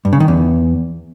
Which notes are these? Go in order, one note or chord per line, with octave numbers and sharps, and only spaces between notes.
G2
C#3
D#3
E2